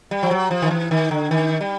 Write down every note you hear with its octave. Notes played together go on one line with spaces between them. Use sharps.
G3
F3
F#3
F3
D#3
E3
D#3
D3
D#3
G3